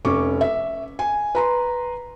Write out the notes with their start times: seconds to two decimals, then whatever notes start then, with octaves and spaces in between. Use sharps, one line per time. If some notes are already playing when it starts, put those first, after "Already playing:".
0.05 F1 C#4 C#6 D6
0.41 E5
0.99 G#5
1.35 B4 A#5 C6